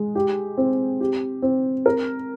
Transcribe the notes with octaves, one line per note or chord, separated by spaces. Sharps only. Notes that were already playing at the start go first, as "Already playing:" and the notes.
Already playing: G#3
G4
C4
G4
C4
A#4